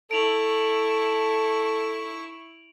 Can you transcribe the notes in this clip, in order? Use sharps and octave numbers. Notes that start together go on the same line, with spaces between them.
E4 A4 C#6 D7 F7 F#7